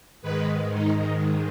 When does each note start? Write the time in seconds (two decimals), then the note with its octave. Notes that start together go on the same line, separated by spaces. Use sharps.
0.22 G#2 D#3 G#3 B4
0.73 D#4